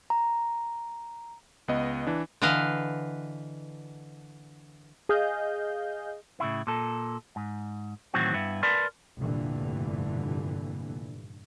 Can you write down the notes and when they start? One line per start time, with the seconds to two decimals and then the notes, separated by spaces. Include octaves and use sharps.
0.10 A#5
1.68 C#2 B3 D#5
2.07 E3 D4
2.42 D3 E3 B4 D#5 F5
5.09 G#4 D#5 F5 G6
6.40 A2 C#3 E4
6.67 A#2 A4
7.36 G#2
8.14 A2 D#3 E3 F#3 C4 F#4
8.34 G2 B3 E4
8.63 A#4 B4 D5 A5 B5 C6
9.18 F1 G2 A#2 D3 E3